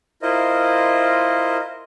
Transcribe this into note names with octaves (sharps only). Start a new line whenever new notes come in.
E4 F4 A#4 C5 D#5